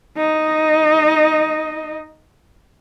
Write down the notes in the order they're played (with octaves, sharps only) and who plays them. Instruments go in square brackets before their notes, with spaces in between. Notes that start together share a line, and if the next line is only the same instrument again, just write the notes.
[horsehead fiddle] D#4 D#5